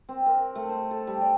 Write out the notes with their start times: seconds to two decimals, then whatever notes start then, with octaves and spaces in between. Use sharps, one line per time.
0.09 C4
0.26 A#4
0.55 A3
0.69 C5
0.91 A4
1.07 G3
1.21 D5